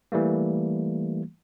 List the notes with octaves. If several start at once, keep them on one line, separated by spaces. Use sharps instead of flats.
E3 G3 A3 A#3